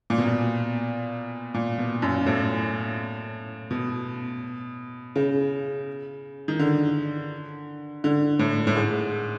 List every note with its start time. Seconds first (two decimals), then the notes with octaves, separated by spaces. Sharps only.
0.10 A#2
0.18 B2
0.25 A#2
1.54 A#2
1.78 B2
2.02 F#2
2.26 A2
3.71 B2
5.16 C#3
6.48 D#3
6.59 D3
8.04 D3
8.39 A2
8.67 A2
8.75 G#2